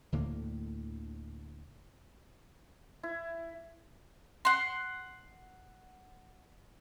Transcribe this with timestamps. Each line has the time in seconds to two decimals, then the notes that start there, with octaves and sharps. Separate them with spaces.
0.12 D2 A2 D3 A#3
3.03 E4
4.45 F#5 C6